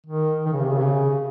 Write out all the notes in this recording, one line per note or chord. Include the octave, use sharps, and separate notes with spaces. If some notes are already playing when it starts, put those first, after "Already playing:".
D#3
D#3
C#3
C3
C#3
C3
C#3